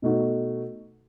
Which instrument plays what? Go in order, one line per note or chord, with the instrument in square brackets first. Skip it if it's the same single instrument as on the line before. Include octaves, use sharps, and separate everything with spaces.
[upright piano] B2 A3 D#4 F#4